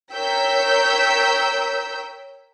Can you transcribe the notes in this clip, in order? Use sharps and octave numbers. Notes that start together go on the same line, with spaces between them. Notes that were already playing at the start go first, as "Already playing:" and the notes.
A#4 C#5 G5 E6 G6 B6